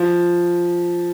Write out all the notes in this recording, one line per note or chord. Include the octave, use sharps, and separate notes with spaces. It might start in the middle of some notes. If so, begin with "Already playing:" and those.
Already playing: F3